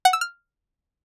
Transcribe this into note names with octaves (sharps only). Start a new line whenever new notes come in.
F#5
E6
F6